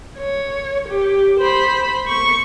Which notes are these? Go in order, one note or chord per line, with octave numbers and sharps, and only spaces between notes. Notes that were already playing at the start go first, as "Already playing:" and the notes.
C#5
G4
C5 B5
C#6